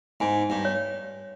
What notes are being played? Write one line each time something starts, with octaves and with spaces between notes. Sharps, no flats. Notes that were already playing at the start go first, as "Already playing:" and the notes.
G#2 G#5
G2
C#5